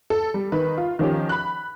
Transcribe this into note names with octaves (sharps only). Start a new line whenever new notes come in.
A4
G3
D#3 B4
F4
D#3 F3 C#4 G4
B5 F#6